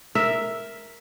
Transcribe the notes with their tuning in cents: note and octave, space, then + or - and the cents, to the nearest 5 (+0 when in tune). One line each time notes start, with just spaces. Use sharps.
A#4 +0 E5 +0